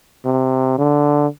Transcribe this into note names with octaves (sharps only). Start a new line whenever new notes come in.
C3
D3